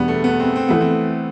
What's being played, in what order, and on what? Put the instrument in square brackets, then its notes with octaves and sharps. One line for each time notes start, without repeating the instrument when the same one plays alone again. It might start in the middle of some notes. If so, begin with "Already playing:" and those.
Already playing: [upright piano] E2 B2 G3 D4 [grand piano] B3
[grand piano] A3
B3
C4
C4
[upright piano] E3 A3 E4 [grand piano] B3
[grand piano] C4